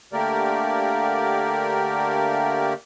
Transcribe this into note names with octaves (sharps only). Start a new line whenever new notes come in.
D3 A3 A#3 G4 A#4 D5